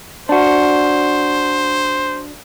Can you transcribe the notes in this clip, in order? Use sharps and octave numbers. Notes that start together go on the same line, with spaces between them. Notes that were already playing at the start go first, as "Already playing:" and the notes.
D4 F#4 C5